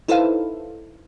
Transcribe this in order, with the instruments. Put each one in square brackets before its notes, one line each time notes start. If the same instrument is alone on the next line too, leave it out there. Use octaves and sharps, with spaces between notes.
[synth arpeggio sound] D#4 E4 A4 B4 C5 F5